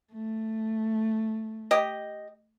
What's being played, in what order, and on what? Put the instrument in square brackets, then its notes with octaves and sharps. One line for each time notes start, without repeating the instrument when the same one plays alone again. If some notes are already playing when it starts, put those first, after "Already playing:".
[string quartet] A3
[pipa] G4 D#5